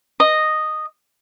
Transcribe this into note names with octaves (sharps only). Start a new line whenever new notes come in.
D#5